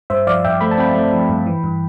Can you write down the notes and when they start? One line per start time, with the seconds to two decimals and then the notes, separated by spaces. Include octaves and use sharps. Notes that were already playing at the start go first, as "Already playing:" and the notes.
0.10 G2 C5 E5
0.27 F3 D5 F5
0.44 G2 E5 G5
0.61 A3 B5
0.71 A5
0.78 C4 G5 B5
0.95 A3
1.13 F3
1.29 G2
1.46 E3
1.64 G2